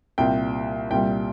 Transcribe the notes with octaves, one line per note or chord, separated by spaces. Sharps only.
C2 A#2 G3 G5
C2 A#2 G3 G5